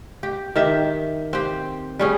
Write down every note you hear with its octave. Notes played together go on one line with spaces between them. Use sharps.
G4
D#3 G4 E5
C4 G4
G3 C#4 G#4